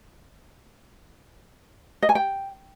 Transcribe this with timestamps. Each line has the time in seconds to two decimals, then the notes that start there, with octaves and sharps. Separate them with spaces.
2.02 D#5
2.09 G#5
2.15 G5